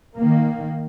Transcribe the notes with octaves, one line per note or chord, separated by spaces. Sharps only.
D#3 A#3